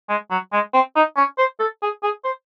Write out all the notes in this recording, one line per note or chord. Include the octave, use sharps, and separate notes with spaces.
G#3
F#3
G#3
C4
D#4
C#4
C5
A4
G#4
G#4
C5